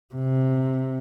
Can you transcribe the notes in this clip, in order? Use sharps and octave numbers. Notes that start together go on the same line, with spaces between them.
C3